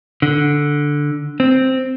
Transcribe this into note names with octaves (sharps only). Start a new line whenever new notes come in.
D3
C4